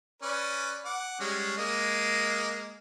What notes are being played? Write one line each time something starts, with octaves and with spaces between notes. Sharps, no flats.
C#4 B4 D5
F#5 D6
G3 G#3 C#4
G#3 A#3 D#5